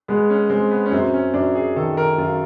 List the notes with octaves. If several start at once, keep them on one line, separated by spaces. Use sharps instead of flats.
G#3 B3
C#4
G#3 C4
B3
C#4
F#2 C4
C#4
F#2 D4
G#4
D#3 A4
A#4
F#2 F4